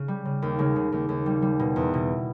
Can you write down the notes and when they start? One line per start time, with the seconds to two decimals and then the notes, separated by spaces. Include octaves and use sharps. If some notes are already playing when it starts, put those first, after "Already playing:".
Already playing: C#3
0.08 G3
0.25 C#3
0.42 D#2
0.59 C#3 G#3
0.76 C#3
0.92 D#2
1.09 D#2
1.26 G3
1.42 G3
1.59 B2
1.76 E2
1.94 B2